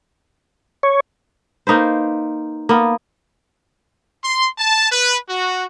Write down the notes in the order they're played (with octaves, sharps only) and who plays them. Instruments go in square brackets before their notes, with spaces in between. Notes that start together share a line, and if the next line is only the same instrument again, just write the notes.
[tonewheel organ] C#5
[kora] A#3 D#4 B4 C5
A#3 B3
[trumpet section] C6
A5
B4
F#4